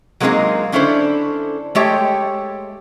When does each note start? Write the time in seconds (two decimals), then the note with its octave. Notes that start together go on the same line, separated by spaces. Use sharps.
0.20 F#3 G#3 A#3 C4 D#4 G#4
0.72 D3 C#4 D4 E4 A4 C5
1.75 G#3 A3 G4 C#5 G5